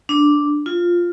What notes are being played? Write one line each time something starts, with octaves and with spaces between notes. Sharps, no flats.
D4
F4